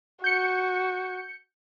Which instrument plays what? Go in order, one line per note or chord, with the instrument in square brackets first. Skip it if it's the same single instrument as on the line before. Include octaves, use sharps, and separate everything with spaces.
[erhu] F#4 [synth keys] G6 C#7